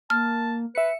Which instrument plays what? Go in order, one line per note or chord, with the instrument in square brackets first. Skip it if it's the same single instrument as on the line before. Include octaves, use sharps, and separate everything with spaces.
[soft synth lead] A#3 [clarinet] A5 [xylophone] F6
[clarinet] B4 [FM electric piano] E5 C#7